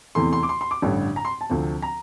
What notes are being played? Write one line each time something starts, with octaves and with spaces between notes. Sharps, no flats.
E2 C3 E3 A3 C6
C6
D6
C6
C6
D6
A1 G2 D3
A#5
C6
A5
D2 C3 F3 C4
A#5